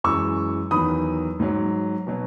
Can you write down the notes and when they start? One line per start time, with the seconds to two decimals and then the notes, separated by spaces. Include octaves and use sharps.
0.04 F#2 E3 G#3 C#6 E6
0.71 E2 D#3 F#3 B5 D#6
1.40 G#2 F#3
2.07 B2 F#3